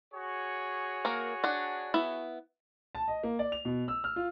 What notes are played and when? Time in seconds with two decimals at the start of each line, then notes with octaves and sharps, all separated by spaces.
0.12 F#4 G#4 C#5
1.05 A#3 A#4
1.44 D4 F#5
1.94 B3 E4
2.95 A5
3.08 D#5
3.23 A#3
3.39 D5
3.52 F7
3.65 B2
3.88 E6
4.04 F6
4.16 F4